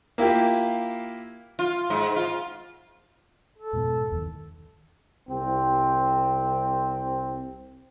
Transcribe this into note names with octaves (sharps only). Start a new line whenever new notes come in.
A#3 E4 F4 G4
F4
G#2
F4
A4
F2 G#2 B2
E2 D#3
C2 C4